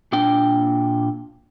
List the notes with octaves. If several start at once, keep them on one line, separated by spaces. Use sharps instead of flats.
A#2 A#3 D4 G5